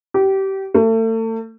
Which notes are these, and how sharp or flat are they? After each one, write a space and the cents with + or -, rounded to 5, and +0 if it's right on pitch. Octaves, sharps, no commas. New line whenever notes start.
G4 -25
A3 +35